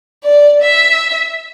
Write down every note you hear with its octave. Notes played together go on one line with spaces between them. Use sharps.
D5
E5